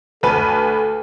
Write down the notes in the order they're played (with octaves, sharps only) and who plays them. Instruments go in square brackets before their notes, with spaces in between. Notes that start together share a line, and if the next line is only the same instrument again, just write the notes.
[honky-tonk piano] D2 B4 D#7 [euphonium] A4 [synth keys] A5 F6